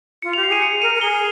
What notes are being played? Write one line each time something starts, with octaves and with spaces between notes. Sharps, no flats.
F4 C#7
G4 F7
C7
G#4 D#7
C#7
A#4 D#7
A#4
G#4 G7